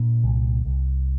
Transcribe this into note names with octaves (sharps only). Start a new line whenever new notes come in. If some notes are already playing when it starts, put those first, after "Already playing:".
Already playing: A#2 D4
C2
C2